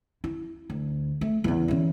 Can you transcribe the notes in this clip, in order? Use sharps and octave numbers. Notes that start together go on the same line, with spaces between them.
E4
D2
A3
E2 C#3
C#3 E3